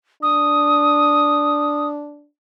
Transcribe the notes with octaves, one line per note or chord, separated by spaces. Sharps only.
D4 D#6